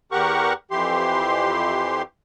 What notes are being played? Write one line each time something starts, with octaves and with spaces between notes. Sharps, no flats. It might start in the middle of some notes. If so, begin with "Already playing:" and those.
E2 G4 A#4 F#5 C#6
F2 E3 G4 C6